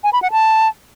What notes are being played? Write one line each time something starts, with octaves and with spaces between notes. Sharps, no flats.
G#5
B5
F#5
A5